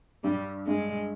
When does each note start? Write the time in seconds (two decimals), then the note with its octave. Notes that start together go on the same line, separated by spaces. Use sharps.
0.24 G2 G3
0.67 G2 G#3